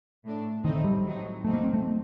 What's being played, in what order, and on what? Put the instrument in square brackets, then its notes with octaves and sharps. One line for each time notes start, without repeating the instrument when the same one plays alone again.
[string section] A2 A3 D4
[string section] A2 A3 C4 D#4 [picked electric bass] D#3
[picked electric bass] G3
[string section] A2 F#3 C4 D#4
[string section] F#3 C4 D#4 [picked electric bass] A3
[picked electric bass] A#3
C4
A3